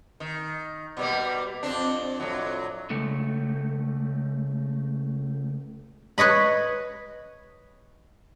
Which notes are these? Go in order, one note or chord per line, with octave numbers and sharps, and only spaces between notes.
D#3
B2 G3 A#3
F2 C4 D4
F2 A2 F#3
C#2 A3
B4 C#5 D#5 B5